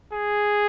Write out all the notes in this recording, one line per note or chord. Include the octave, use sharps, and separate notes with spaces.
G#4